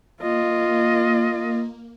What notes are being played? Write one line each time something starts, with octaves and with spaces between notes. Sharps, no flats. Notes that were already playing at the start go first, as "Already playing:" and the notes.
A#3 F4 D#5